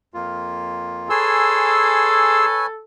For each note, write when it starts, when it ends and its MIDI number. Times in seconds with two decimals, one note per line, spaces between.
0.14 1.09 41
0.14 1.09 58
0.14 1.09 65
1.10 2.46 68
1.10 2.85 69
1.10 2.66 71
1.10 2.66 73
1.10 2.66 80
1.10 2.46 84
1.10 2.46 88